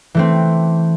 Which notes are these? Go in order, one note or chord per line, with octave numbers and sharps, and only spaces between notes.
E3 A3 C4